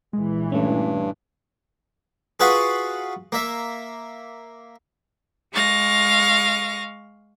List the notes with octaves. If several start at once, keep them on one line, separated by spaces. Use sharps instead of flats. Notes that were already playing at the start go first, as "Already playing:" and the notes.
A#1 E3 G#3
G2 A3 C#4
F4 F#4 G#4 B4 F5 F#5
A#3 E5
G#3 F5 C#6 A#6